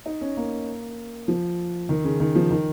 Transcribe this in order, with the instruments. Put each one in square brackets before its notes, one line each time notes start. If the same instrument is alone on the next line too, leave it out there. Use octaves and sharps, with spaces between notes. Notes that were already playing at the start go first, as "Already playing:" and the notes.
[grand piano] D#4
C#4
A#3
F3
D#3
C#3
D#3
F3
D#3